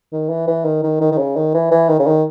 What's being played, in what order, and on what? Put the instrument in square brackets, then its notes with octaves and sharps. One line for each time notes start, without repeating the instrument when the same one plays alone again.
[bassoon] D#3
E3
E3
D#3
D#3
D#3
D#3
C#3
D#3
E3
E3
D#3
C#3
D#3